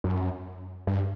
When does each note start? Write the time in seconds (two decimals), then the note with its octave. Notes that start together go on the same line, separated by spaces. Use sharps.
0.04 F#2
0.87 G2